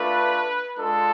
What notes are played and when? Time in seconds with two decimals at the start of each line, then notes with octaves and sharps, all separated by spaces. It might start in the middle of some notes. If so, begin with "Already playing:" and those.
Already playing: A3 D4 F4 B4
0.78 G#3 D4 F4 A4